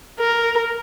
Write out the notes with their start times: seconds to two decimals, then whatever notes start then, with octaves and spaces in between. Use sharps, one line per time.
0.19 A#4